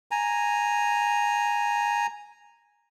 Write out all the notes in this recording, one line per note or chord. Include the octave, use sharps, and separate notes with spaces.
G#5 A#5